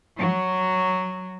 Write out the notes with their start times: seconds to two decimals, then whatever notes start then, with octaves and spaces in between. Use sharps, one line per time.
0.19 F#3